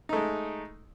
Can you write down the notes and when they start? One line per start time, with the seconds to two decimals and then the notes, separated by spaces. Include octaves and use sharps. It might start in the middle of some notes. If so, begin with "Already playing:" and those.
0.09 D#4
0.13 A3
0.16 G#3